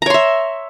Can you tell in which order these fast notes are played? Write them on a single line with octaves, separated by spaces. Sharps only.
A#5 C#5 C6 E5